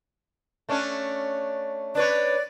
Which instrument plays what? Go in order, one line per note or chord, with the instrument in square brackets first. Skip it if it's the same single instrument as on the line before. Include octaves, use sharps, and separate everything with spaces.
[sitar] A3 C#4 D4
[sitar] D4 B4 C#5 [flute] D5